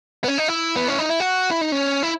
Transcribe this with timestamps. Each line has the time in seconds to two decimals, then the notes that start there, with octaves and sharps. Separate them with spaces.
0.24 B3
0.28 C#4
0.38 D#4
0.48 E4
0.76 B3
0.88 C#4
0.99 D#4
1.09 E4
1.20 F#4
1.51 E4
1.61 D#4
1.72 C#4
2.03 E4